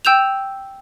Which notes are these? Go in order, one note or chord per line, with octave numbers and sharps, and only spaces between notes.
G5 E6 G6 E7 F7